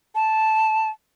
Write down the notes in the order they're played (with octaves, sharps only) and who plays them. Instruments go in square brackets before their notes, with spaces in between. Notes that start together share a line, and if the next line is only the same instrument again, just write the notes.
[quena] A5